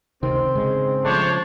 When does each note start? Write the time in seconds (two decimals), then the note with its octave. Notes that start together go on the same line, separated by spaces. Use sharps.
0.23 C#2 C3 D#3 C4
0.55 G#2 C#3 G#3
1.05 F3 G#3 A3 D4 C5 C#5